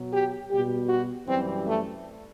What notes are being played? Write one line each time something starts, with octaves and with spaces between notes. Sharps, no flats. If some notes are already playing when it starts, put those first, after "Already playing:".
Already playing: B2 F#3
G4
B2 G3 G4
F#4
F#2 E3 G3 C4
A3